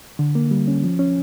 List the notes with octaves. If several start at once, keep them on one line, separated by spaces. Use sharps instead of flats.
D3
A#3
G3
C#4
F3
C#4